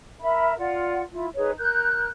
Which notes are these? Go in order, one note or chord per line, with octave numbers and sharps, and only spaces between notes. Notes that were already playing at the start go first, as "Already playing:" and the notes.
A#4 E5 B5
F4 D5 F#5
E4 F4
D#4 G#4 B4 C#5
A#4 F#6 G6